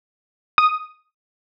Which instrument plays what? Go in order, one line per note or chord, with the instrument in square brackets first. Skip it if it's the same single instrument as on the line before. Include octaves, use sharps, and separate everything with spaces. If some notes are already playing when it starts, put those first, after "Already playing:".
[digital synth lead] D#6